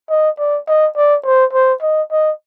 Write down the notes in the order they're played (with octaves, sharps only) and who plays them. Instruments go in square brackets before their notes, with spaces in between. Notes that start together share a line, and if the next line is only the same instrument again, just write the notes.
[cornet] D#5
D5
D#5
D5
C5
C5
D#5
D#5